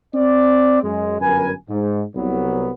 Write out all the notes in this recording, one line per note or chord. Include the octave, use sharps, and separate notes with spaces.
C4 D5
F#2 G#3
G1 F#2 A#4 B4 G#5
G#2
C2 F#3 B3